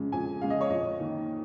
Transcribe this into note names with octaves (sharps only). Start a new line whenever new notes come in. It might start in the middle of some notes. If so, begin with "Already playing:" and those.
Already playing: F2 C#3 G#3
F2 G#5
C#3 G#3 F5
D#5
C#5
F2 D#5
D#3 A#3